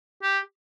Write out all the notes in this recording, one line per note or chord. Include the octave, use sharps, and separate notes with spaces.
G4